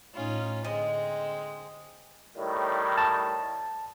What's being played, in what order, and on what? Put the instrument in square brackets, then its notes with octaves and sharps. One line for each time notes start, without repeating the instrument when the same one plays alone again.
[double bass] A2 D#4 [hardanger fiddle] C#4 F4
[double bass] D3 [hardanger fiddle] G#3 C4 [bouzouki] D#5
[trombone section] A2 D#3 G3
[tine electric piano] A5